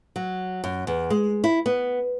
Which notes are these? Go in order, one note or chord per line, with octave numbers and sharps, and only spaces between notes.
F#3
F#2
E2
G#3
E4
B3